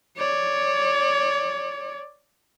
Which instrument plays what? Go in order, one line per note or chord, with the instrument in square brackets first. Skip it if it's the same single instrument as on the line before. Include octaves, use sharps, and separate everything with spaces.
[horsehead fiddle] C#5 D5